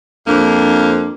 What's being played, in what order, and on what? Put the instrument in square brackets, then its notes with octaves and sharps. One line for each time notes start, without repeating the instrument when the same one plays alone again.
[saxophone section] F2 A#3 [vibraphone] D4